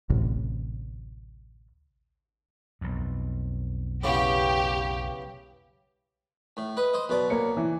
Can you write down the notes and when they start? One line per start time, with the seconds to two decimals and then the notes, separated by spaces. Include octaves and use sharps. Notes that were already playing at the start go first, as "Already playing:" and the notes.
0.10 A1 D2 A2 C3
2.81 B1 F2
4.04 C#3 E3 B3 G4 F5 C#6 D6
6.57 A2
6.77 B4 D#5
6.94 C5 D#5
7.09 B2 F#3 B4 D5
7.30 A#3 C#5 C#7
7.57 E3